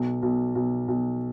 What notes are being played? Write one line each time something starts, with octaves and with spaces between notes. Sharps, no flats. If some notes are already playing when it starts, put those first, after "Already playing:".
Already playing: B1
B1
B1
B1